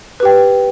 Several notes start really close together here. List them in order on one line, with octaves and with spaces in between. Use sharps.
B4 G4 G5